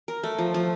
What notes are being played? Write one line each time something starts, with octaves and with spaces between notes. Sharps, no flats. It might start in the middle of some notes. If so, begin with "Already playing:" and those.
A#4
A3
F3
F3